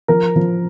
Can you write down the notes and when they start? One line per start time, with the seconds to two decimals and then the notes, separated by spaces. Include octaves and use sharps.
0.08 F3 A#4
0.36 F3